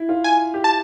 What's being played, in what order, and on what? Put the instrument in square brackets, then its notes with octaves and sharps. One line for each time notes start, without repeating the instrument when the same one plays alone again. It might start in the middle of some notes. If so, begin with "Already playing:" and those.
Already playing: [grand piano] E4
F4
[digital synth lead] G#5
[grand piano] G4
[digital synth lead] A5